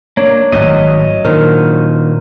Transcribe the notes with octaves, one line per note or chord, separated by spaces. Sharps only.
A#3 D4 C#5
G#1 F#2 A2 F#3 D#5
A#2 D#3 D4 A#4 C5